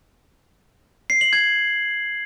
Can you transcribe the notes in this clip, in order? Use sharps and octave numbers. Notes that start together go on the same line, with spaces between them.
C7
F#7
G#6